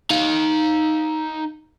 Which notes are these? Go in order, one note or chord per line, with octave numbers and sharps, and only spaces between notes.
D#4 F5